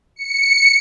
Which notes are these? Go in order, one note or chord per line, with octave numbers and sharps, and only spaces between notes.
C#7